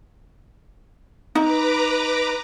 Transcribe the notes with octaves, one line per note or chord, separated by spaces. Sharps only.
D#4 B4 A#5 D6